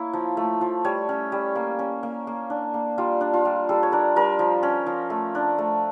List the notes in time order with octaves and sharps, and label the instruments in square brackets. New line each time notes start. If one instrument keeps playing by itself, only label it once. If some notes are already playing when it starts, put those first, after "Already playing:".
Already playing: [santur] A#3 E4 C#5
F3
A3
F3
G3 C#5
C#4
G3
A#3
C#4
A#3
A#3
D4
A#3
G3 F4
D4
F4
G3
G3 A4
C#5
D4 A#4
G3 A#4
F3
C#4
F3
A3
D4
A3